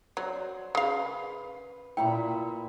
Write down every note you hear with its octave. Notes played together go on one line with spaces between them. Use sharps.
F#3 C5 D5
C#3 B4 F5
A#2 E4 G5 A#5 B5